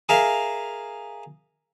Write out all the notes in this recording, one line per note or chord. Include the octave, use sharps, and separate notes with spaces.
G#4 A#4 E5 F5